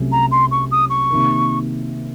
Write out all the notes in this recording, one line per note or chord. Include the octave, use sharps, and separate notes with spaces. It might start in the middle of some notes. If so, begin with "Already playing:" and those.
Already playing: C2 C3 F#3 A3 C#4
A#5
C6
C#6
D#6
C#6
C3 D#3 A#3